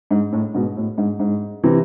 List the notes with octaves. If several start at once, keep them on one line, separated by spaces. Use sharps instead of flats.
G#2
A2
G#2 B2
A2
G#2
G#2
C3 E3